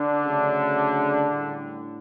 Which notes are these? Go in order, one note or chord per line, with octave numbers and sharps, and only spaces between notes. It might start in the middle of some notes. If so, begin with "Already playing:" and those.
Already playing: D3 D4
C#3 F#3 A3
A2 G3